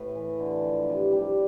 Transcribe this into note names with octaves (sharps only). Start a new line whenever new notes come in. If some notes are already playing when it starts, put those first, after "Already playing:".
Already playing: A2 B4
E3
D3
F3
C3
G3